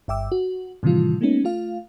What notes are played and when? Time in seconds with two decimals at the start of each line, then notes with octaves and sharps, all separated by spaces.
0.08 G1 G2 E5 G5 D6 E6
0.32 F#4
0.83 A2 C3 D#3 E3 G3 F4
1.21 G#3 A#3 B3 C#4 D#4
1.44 A3 F4 F5